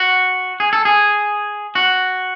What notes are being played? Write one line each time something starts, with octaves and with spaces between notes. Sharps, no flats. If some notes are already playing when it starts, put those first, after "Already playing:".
Already playing: F#4
G#4
A4
G#4
F#4